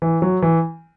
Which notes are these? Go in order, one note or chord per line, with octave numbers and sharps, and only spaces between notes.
E3
F#3
E3